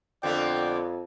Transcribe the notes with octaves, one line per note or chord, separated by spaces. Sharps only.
F2 D3 A#3 B3 D5 G5